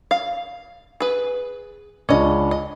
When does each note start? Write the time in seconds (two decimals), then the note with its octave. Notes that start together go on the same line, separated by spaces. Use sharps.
0.11 F5
1.00 G#4 B4
2.09 C#2 C#4 D4 D#5
2.51 D#5